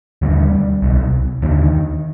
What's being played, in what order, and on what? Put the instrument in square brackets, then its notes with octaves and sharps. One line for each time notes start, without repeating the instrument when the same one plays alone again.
[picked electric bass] D#2 D3 G3
C2 B2
D#2 D3 D#3